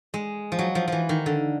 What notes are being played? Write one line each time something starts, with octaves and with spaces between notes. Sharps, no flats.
G#3
F3
F#3
F3
E3 F3
D#3
D3